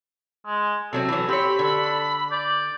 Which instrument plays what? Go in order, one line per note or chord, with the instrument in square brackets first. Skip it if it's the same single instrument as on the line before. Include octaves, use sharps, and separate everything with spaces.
[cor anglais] G#3
[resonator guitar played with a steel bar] C3 F#3 C4 [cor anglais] A4
[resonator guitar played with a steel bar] E3 F#3
[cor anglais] C4 [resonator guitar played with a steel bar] G4 C#5 [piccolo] B5
[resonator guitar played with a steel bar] D3 [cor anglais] A4
[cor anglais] D5 [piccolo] G6